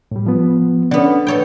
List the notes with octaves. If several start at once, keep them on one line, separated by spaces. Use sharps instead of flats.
A2 G3
F3 B3
D3 B3 C#4 D5
A4 B4 C#5 G5